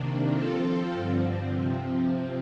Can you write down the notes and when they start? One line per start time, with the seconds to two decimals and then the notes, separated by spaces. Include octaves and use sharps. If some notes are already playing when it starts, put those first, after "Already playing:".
Already playing: C3 D#3 A#3 D4
0.30 F3 C4 F4 A4
0.92 G2 D3 F3 C4
1.54 C3 F3 C4